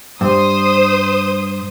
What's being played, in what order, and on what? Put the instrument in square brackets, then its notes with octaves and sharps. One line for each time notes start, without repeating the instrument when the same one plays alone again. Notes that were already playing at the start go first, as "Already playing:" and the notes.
[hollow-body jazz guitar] G2 [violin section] C5 D#6